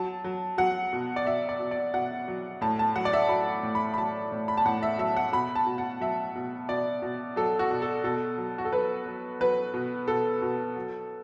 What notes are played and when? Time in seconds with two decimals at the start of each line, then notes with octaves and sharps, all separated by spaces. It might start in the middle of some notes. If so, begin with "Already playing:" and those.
Already playing: F#3 A5
0.24 F#3
0.58 F#3 F#5
0.93 B2
1.16 D5
1.25 B2 E5
1.49 D5
1.60 B2
1.71 D5
1.94 B2 F#5
2.28 F#3
2.61 A2 A5
2.79 A5
2.96 F#3 F#5
3.05 D5
3.13 E5
3.29 F#3 B5
3.63 A2
3.75 B5
3.94 B5
3.97 F#3 A5
4.32 A2
4.48 B5
4.57 A5
4.65 A2 F#5
4.83 E5
4.99 F#3 E5
5.17 F#5
5.33 B2 B5
5.55 A5
5.66 B2
5.78 F#5
6.01 F#3 E5
6.35 B2
6.69 B2 D5
7.02 B2
7.36 F#3 A4
7.59 F#4
7.71 B2
7.82 A4
8.04 B2 A4
8.38 F#3
8.58 F#4
8.65 A4
8.73 F#3 B4
9.06 F#3
9.40 F#3 B4
9.74 B2
10.08 B2 A4
10.42 B2
10.77 F#3